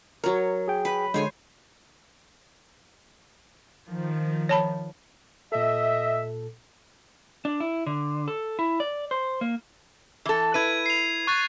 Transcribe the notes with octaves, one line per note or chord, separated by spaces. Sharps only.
F#3 A#4 C#5
G#4 G5
B4
D3 G#3 C5 C#5 G#5
D#3 F3
C#5 A5 B5
A#2 A4 D#5 E5
D4
E4
D3
A4
E4
D5
C5
A#3
E3 A4
E4 B4 G#6 D#7
C7 F7
C#6 F#6 A6